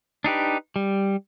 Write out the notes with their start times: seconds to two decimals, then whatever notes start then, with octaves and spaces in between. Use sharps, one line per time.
0.24 D4 D#4 G4 B4
0.76 G3